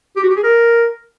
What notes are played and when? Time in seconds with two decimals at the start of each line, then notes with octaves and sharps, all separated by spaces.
0.16 G4
0.23 F#4
0.30 G4
0.37 G#4
0.43 A#4